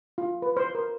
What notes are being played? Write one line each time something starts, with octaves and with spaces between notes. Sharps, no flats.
F4
B4
C5
A#4